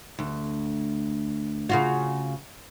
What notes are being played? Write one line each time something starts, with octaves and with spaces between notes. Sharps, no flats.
D2
C#3 F4 F#4